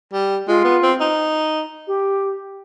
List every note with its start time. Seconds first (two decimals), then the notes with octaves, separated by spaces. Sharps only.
0.13 G3
0.48 G#3 F4
0.64 B3
0.83 C4
1.00 D#4
1.88 G4